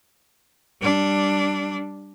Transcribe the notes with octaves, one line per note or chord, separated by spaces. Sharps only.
G3 D4